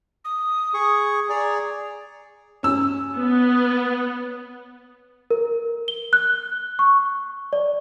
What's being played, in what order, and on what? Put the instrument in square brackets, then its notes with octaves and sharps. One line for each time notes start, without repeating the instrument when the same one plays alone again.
[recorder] D#6
[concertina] G#4 C#6
[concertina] G#4 D5 [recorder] A#5
[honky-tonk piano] C#4 E6
[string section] B3
[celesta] A#4
G7
F#6
C#6
D5